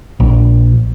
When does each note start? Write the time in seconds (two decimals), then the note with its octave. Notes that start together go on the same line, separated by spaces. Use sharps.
0.20 A#1